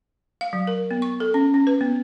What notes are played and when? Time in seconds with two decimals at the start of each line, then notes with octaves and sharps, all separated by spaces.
0.41 F5
0.53 F#3
0.67 A#4
0.91 B3
1.02 C#6
1.20 A4
1.34 C#4
1.54 C#4
1.67 B4
1.81 B3